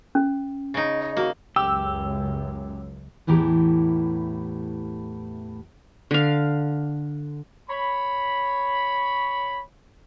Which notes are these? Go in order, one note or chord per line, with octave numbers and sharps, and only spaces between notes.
C#4
C#3 D#4
D#5
A#3 F#4
C#2 F#2 G4 E6
E2 A2 E3 G4 A#5
D3 F5
C#5 B5